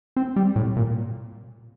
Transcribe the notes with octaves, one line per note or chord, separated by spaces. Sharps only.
C4
G3
A2
A#2